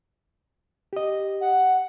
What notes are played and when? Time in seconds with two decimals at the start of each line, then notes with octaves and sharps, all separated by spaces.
0.93 G4 D#5
1.41 F#5